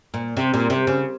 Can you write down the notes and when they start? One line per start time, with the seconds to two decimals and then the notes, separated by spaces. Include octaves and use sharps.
0.14 A#2
0.37 C3
0.54 A#2
0.70 C3
0.87 C#3